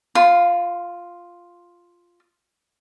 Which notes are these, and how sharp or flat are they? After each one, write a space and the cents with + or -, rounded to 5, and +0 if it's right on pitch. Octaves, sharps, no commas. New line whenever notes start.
F4 +0 C6 -35